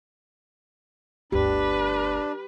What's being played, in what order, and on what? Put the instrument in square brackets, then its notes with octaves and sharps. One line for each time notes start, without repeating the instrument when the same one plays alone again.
[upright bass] G1 D2 [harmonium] D4 [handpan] G4 [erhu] B4